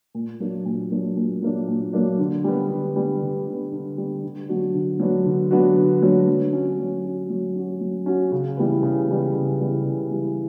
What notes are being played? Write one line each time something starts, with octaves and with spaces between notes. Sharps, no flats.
A#2
F#3 A#3 D4
A#2
F#3 A#3 D4
A#2
F#3 A#3 D4
A#2
F#3 A#3 D4
D3
G3 B3
D3
G3 B3
D3
G3 B3
D3
G3 B3
D3
F#3 B3 D4 F#4
D3
F#3 B3 D4 F#4
D3
F#3 B3 D4 F#4
D3
F#3 B3 D4 F#4
F#3
C#4 F#4
F#3
C#4 F#4
F#3
C#4 F#4
F#3
C#4 F#4
C#3
E3 G3 B3
C#3
E3 G3 B3
C#3
E3 G3 B3
C#3
E3 G3 B3